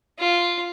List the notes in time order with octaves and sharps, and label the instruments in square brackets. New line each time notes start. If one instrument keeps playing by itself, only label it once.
[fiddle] F4